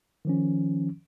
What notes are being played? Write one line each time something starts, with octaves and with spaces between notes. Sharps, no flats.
D#3 F3 C#4